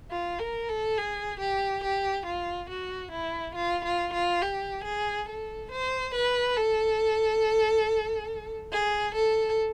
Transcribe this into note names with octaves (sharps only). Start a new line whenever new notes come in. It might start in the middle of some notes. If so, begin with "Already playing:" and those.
F4
A#4
A4
G#4
G4
G4
F4
F#4
E4
F4
F4
F4
G4
G#4
A4
C5
B4
A4
G#4
A4